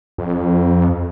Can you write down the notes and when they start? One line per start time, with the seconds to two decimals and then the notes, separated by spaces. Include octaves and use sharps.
0.18 F2